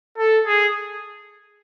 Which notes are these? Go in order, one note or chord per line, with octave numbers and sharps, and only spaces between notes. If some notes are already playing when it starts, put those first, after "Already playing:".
A4
G#4